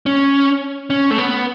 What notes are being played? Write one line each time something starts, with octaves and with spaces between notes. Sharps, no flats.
C#4
C#4
A3
B3